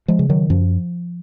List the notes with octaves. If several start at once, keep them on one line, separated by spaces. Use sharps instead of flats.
F3 G#3
C#3
D#3 F#3
F#2 F3